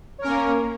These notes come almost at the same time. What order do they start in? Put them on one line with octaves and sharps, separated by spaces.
C#5 A#4 C#4 A#3